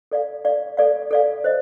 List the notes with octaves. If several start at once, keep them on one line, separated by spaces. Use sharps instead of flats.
A4 D5 F5
A4 D5 F5
A4 D5 F5
A4 D5 F5
C5 D#5